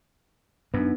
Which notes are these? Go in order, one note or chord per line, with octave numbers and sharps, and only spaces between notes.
F#2 B3 D4 D#4